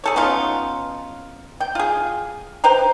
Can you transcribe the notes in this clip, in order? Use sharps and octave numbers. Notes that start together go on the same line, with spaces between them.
G#4 A4 C#5
B3 C#4 D#4 F4
G5
F4 G#4
B4 C5 G5 A#5